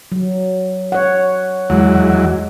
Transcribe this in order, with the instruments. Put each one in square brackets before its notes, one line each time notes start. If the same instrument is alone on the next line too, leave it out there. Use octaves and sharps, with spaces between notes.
[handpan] F#3
C#5 F#5
[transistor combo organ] E2 F#3 [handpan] G#3